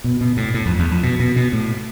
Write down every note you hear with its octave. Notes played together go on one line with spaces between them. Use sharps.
B2
B2
A2
A2
F2
E2
F2
B2
B2
B2
A2